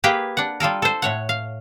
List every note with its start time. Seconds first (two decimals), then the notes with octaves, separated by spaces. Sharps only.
0.04 A#3 G4 G#4 B4 G5
0.37 D4 F#5
0.60 G3 F4 A4 A#4
0.82 A4 C5
1.02 A2 C#5 F#5
1.29 F5